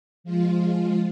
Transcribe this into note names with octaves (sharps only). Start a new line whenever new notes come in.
F3 G#3 F4